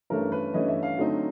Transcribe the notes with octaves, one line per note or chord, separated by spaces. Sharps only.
G2 E3 A3 C#4 A#4
B4
G2 E3 A3 C#4 D#5
E5
F5
D3 F#3 A3 C4 D#4